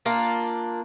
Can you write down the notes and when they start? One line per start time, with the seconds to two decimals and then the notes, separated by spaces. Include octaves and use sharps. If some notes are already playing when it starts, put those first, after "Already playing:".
0.05 A#3 D4 F4